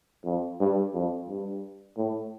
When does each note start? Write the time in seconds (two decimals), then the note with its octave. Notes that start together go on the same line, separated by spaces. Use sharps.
0.25 F2
0.60 G2
0.94 F2
1.29 G2
1.97 A2